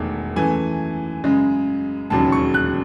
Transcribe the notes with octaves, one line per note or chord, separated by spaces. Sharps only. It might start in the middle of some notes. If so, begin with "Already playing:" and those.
Already playing: E1 E2 D#3 A3
F#2 E3 A3 G#5
F#2 C#3 G#3
E1 D#2 C#3 F#3 A5
C#6
F#6